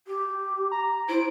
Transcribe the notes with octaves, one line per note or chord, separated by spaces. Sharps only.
G4
A#5
E4 C5 D7